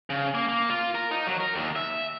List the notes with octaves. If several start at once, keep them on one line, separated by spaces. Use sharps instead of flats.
C#3
A#3
A#3
F4
A#4
D#4
F#3
A#4
D#2
E5